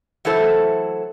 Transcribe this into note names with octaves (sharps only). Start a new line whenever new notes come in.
E3 F#3 A3 E4 A4 C5